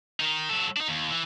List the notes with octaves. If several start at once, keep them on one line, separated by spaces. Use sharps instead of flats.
D#3 D#4
F#3 A4
D4 D#4
D#2
E3